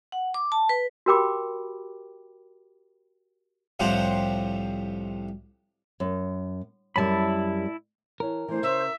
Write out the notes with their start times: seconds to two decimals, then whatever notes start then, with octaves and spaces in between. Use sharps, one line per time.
0.12 F#5
0.34 D6
0.52 A5
0.69 B4
1.06 F#4 G4 A#4 G5 B5 D6
3.80 C2 A2 F3 G4 C5 F#5
6.00 F#2
6.96 F#2 G3 E4 A5 B5
8.20 E3 A#4 C#5 A5
8.48 E3 A3 D4 C5
8.63 C#3 E5